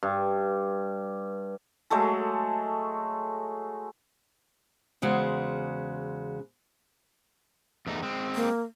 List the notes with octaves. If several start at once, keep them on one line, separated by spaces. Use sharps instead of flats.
G2
F#3 G#3 A3 A4
E2 C#3 G#3 F#4 C5
E2 A3 D#4
G#3 C4
A#3